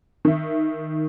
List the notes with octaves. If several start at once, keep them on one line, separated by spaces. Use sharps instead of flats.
D#3 E5